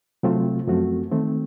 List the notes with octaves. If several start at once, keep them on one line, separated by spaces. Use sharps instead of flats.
C3 F#3 A3 C4 F4
F#2 F3 A3 C4 F#4
D#3 A3 C4